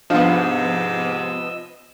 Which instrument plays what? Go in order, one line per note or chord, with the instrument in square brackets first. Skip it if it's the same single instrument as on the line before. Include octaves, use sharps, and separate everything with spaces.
[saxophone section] G#2 C3 [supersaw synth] F3 B3 [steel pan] D4 F5 [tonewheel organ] D#5 E6